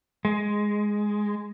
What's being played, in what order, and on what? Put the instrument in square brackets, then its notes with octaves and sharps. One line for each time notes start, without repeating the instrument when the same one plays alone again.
[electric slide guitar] G#3